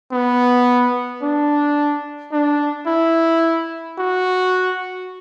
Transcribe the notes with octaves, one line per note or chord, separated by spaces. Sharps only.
B3
D4
D4
E4
F#4